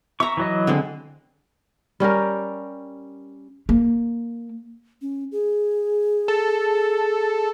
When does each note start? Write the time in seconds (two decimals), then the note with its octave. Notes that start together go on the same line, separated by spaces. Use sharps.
0.20 E5 A#5 C#6
0.37 E3 F#3 D#5
0.67 D3 G#3 C4
2.00 G3 C#4 G4 A#4
3.69 A#3
5.02 C#4
5.32 G#4
6.28 A4